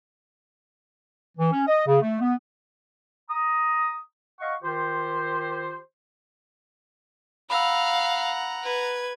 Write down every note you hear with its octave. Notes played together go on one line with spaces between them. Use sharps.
E3
C#4
D#5
C#3
A3
B3
A#5 D#6
D#5 F5 F#5 C#6
D#3 F4 G4 C5
F5 F#5 A#5 B5 E6
B4 G#6